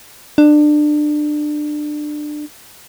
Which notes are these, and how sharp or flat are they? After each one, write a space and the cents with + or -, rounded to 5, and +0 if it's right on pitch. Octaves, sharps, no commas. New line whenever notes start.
D4 +25